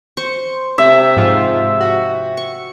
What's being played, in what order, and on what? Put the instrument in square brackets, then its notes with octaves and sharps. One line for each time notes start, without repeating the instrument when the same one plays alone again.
[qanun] C5 C#6
[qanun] C3 [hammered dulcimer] E5
[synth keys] G#2 F3 F4
F#4
[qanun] C#6